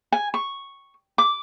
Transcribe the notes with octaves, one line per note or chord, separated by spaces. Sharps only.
G#5
C#6
D6